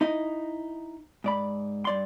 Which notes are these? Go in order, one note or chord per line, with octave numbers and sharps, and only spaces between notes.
D#4 E4 D#5
G#2 D5 B5
G2 D5 C6